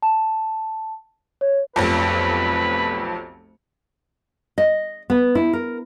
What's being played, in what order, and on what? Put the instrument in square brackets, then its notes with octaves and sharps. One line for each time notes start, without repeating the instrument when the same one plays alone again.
[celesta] A5
C#5
[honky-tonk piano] F1 B1 F2 [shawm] B4
[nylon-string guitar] D#5
B3
E4
A#4